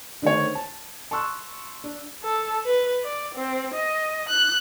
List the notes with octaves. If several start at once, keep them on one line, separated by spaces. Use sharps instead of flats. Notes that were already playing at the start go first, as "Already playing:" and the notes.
D3 D#3 A3 C5 C#5
A5
A5 C6 C#6 E6 F#6
D4
A4
B4
D5
C4
D#5
F#6